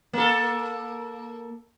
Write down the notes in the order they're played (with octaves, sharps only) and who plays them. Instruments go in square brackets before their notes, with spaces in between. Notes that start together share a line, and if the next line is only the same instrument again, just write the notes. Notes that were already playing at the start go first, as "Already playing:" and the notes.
[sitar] A#3 A4